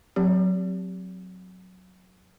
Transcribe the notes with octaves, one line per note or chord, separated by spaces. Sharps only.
F#3 C4 G4